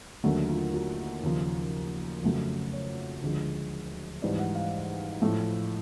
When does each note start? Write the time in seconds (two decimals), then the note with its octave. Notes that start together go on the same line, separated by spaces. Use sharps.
0.24 D#2 D3 F#3 A3
0.49 F4
0.74 F#4
1.23 D#2 C#3 F3
2.23 F2 C#3 F#3 A3
2.73 C#5
3.22 D2 D3 F3 G#3
4.22 G#2 E3 G3 D5
4.39 F#5
4.55 F5
5.22 A2 F3 A3